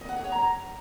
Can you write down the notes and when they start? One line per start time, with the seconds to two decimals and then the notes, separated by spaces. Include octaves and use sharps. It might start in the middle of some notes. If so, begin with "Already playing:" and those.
0.01 D#5
0.09 F#5
0.16 G#4
0.24 C#5
0.32 A#5